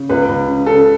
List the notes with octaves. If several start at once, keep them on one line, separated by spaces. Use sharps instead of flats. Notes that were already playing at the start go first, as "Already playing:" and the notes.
Already playing: C#3
C#2 B4
C#2
C#3
C#3 A4